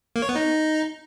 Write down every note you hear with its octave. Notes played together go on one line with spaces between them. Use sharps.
A#3
C#5
B3
D#4